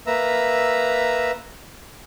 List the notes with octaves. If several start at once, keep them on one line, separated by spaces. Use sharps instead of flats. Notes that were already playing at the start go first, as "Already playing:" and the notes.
A#3 B4 E5 A#5 E6